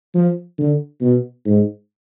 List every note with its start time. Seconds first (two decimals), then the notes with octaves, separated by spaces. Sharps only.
0.15 F3
0.58 D3
1.01 B2
1.46 G#2